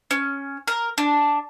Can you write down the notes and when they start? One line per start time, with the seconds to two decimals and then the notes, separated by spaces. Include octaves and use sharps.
0.11 C#4
0.68 A#4
0.98 D4